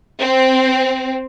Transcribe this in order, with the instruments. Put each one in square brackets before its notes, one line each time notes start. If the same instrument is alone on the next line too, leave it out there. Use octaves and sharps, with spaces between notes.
[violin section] C4